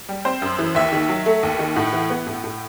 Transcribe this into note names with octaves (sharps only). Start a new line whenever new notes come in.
G3
C4 C5
F#2
E3
D#2 E5
D#3
F#3
A3
D#2
D#3
A2 F#5
E3
B3
A2
A2